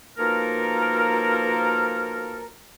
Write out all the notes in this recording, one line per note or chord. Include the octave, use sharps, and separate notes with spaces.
B2 F3 A#3 D#4 A4 A#4